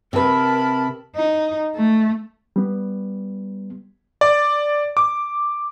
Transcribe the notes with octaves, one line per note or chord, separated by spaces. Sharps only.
C3 A#4 B4 A5 B5
D#4
A3
G3 B3
D5
D6